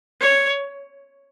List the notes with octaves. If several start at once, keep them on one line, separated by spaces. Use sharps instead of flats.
C#5